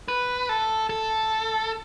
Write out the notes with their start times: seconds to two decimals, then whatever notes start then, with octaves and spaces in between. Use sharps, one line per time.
0.08 B4
0.49 A4
0.90 A4